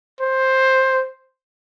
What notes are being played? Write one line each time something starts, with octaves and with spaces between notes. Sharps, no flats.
C5